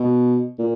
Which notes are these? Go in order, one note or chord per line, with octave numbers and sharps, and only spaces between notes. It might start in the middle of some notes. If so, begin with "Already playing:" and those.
Already playing: B2
A#2